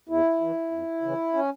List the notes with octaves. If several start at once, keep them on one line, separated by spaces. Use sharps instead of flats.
E2 E4
E3
F2
C#3 E3
C#4